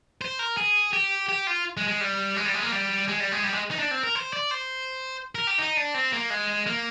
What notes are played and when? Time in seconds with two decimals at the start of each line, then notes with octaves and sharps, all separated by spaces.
0.21 C5
0.39 A#4
0.57 G#4
0.93 G4
1.29 G4
1.47 F4
1.77 G#3
1.88 G#3
2.01 G3
2.36 G#3
2.46 G3
2.54 G#3
2.63 A#3
2.72 G3
3.08 G#3
3.20 G3
3.32 G#3
3.44 G3
3.53 G#3
3.71 D#4
3.79 D4
3.91 C4
4.03 A#4
4.15 C5
4.33 D5
4.51 C5
5.35 A#4
5.47 G4
5.58 D#4
5.77 D4
5.94 C4
6.13 A#3
6.30 G#3
6.67 A#3